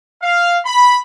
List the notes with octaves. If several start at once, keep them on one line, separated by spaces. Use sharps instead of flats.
F5
B5